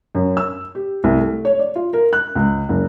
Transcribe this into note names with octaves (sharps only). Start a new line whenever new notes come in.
F#2
E6
G4
C2
A3
C#5
D5
F4
A#4
F#6
C#2
F#1